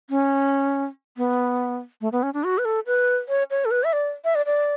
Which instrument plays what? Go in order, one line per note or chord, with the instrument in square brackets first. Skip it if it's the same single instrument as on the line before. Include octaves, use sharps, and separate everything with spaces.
[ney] C#4
B3
A3
B3
C#4
D4
F#4
B4
A4
B4
C#5
C#5
A4
B4
E5
D5
E5
D5
D5